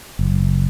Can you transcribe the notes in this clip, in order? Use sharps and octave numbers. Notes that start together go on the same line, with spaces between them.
F#1